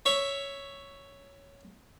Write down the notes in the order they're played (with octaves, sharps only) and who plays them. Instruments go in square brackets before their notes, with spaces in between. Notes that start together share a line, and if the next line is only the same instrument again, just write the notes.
[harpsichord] C#5 E5